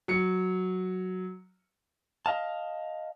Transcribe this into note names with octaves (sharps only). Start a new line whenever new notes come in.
F#3 C#7
D#5 F5 A5